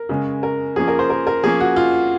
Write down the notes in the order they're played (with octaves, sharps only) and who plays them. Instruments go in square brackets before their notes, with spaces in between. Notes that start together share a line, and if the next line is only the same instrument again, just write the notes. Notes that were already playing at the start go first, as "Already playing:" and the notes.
Already playing: [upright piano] A#4
C#3 G#3 C#4
A#4
F3 A#3 C#4 G#4
A#4
C5
A#4
A#4
F3 A#3 C#4 G#4
F#4
F4